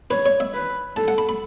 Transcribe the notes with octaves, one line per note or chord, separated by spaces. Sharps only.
B4 C#5
C#5
E5
B4
A4 A5
F#5
B5
B5